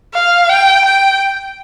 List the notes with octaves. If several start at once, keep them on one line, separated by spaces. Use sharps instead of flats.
F5
G5
G5